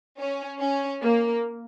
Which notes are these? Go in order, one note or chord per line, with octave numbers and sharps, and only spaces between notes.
C#4
C#4
A#3